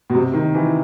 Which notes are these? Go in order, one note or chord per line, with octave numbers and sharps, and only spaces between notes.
B2
C3
D#3
E3